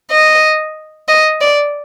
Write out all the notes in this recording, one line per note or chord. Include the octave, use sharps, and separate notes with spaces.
D#5
D#5
D5